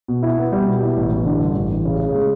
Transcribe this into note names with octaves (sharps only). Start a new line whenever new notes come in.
B2
E4
B3
G3
B2
E4
A1
A1
D3
G2
A1
A1
C#3
C#3
G#3